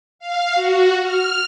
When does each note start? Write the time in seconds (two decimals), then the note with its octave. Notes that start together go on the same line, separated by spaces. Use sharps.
0.19 F5
0.53 F#4
1.02 F6